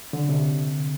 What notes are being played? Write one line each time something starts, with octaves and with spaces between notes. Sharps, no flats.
D3
C3